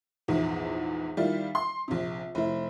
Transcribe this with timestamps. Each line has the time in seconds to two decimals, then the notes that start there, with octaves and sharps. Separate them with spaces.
0.28 A#1 E2 G#2
1.17 D#3 G3 E4 F4
1.55 C6
1.88 A#1 C3
2.35 F1 E4